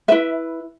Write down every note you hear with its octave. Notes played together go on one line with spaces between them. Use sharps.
E4 B4 E5